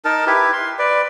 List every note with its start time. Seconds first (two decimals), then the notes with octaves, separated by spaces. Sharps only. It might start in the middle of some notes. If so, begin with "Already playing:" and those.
0.05 D#4 A#4 A5
0.27 E4 G4 B4
0.53 C6
0.79 B4 D5